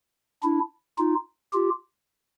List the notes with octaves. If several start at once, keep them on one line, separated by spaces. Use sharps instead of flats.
D4 E4
D#4 F4
F4 G4